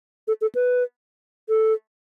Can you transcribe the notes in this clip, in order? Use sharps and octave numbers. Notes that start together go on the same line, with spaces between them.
A4
A4
B4
A4